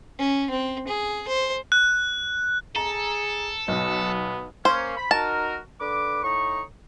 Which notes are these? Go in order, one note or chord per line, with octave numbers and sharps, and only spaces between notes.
C#4
C4
G#4
C5
F#6
G#4 A4 A#5
B1 B3
A#3 C#4 C5
B5
D#4 F#4 A#4 A5
D3 B4 D6
A2 D#4 C#6